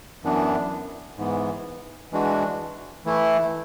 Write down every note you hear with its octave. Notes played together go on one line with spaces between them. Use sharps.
F#2 E3 B3 D4
G#2 E3 B3
E3 G#3 D4 F#4
E3 A3 E4